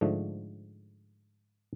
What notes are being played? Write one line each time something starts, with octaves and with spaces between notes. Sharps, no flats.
G#2 D3 F3 A3